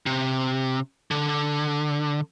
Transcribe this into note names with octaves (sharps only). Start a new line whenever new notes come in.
C3
D3